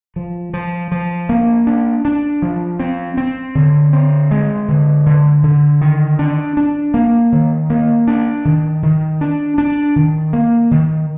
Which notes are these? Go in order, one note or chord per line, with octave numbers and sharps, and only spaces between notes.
F3
F3
F3
A#3
D4
D4
F3
C4
C4
D3
C4
G#3
D3
D3
D3
D#3
D4
D4
A#3
D#3
A#3
D4
D#3
D#3
D4
D4
D#3
A#3
D#3